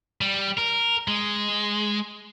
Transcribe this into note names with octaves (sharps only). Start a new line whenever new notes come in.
G3
A#4
G#3